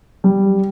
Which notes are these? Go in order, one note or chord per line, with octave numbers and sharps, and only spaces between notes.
G3